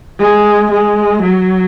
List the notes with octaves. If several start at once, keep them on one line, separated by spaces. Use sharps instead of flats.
G#3
G#3
F#3